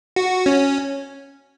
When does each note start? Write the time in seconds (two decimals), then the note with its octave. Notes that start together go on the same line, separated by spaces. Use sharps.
0.16 F#4
0.46 C#4